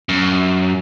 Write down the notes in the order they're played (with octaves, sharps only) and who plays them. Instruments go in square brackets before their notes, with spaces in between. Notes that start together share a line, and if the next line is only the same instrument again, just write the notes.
[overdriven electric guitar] F#2